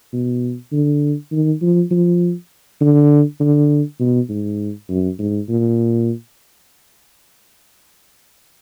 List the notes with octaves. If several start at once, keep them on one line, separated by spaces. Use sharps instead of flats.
B2
D3
D#3
F3
F3
D3
D3
B2
G#2
F#2
G#2
A#2